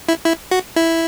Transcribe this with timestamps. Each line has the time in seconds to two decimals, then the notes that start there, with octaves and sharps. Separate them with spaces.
0.09 E4
0.25 E4
0.51 F#4
0.76 E4